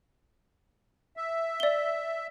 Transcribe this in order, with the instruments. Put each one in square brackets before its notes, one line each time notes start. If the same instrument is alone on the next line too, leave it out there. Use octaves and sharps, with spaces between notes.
[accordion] E5
[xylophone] D5 G7